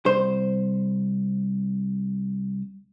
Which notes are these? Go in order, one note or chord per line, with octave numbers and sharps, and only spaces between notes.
C2 C5